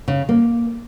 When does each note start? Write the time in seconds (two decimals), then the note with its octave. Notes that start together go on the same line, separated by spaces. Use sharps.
0.08 C#3
0.29 A#3